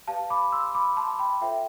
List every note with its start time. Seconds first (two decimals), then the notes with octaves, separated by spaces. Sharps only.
0.07 G4 B4 D5 F5 A5
0.30 B5 D6
0.52 C6 E6
0.75 B5 D6
0.97 A5 C6
1.19 G5 B5
1.41 F4 A4 C5 E5 G5